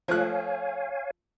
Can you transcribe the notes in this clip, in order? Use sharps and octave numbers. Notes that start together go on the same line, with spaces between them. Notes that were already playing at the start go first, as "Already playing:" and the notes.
F3 A3 C#5 F5 G#5 F#6